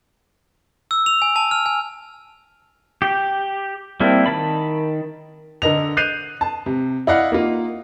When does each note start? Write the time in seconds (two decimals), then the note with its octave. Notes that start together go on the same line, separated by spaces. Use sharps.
0.91 E6
1.06 F7
1.22 G#5
1.36 A5
1.51 F6
1.66 G#5
3.02 G4
4.00 G3 A#3 C4 E4 A4
4.26 D#3 A5 B5
5.62 D3 A4 A#4 D#5 F7
5.97 F#6 G6 C7 D#7 F7
6.41 A5
6.66 C3
7.07 E4 D5 D#5 F5 F#5
7.32 A#3 D#4 F4